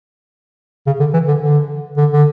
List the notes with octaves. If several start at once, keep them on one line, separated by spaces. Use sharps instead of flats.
C#3
D3
E3
D3
D3
D3
D3